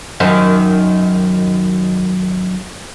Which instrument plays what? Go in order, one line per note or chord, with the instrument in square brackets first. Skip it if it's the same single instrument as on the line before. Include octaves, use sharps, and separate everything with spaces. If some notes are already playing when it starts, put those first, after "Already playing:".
[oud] F#2 D#3